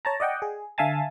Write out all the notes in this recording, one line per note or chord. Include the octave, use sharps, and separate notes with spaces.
C#5 A5 A#5
D5 D#5 F#5 G5
G#4
D3 E5 F5 G#5 A5 A6